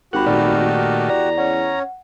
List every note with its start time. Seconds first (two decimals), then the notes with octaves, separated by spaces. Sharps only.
0.13 G#1 F#4 G4 A#4 F#5 B5
0.26 A#2 D#3 A3 D5
1.10 E2 D5 A#5
1.38 C#4 C#5 F#5